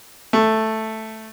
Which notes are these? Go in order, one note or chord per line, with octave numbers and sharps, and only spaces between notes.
A3